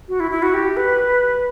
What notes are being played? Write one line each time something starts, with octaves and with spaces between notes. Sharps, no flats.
F#4
E4
E4
F#4
G4
B4